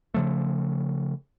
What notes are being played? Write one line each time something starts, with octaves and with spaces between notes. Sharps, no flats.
C#3 F3 A3